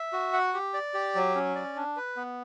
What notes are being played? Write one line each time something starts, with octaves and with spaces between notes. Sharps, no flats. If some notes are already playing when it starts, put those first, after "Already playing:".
Already playing: E5
F#4
F#5
G4
D5
G4
F#3
C#4
D5
D4
B4
B3